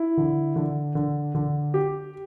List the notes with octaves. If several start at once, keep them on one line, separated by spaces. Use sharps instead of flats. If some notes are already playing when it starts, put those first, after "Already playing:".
Already playing: E4
D3
D3
D3
D3
G4